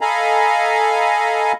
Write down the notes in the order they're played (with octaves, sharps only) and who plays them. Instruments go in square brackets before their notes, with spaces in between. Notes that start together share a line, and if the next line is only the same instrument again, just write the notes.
[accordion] A4 D#5 F5 G#5 A#5 B5